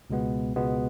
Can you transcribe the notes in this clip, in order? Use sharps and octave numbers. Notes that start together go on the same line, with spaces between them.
C#2 B2 G#3 B3
C#2 B2 G#3 B3